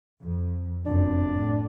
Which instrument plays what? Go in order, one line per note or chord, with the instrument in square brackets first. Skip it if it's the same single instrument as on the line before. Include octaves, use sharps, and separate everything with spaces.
[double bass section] F2
[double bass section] F1 F#2 [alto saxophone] D4
[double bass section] A2